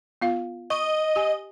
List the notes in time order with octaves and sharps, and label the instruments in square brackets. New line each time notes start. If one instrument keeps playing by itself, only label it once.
[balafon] B3 F4 F5
[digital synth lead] D#5 [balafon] C#6
[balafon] G4 G#5